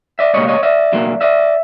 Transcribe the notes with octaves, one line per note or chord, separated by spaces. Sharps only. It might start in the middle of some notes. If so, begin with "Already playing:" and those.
D5 E5
C#2 B2 G3 A#3 C#5 D#5
C#5 D#5
D5 E5
B2 F#3 A#3
D5 E5